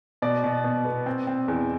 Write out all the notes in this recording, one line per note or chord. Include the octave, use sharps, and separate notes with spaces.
B2 D5
B2
B2
B3
C4
C4
E2